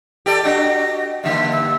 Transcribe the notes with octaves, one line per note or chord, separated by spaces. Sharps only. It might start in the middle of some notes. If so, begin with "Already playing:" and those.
G4 A4 D5
D4 F#4 G4 D#5
G2 D3 A#3 E5
E6